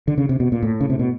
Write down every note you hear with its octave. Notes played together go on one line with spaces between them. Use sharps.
D3
C#3
C3
B2
A#2
A2
C#3
C3
B2